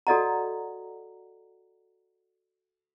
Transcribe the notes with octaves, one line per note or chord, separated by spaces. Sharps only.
F#4 A4 D5 D#5 F#5 A#5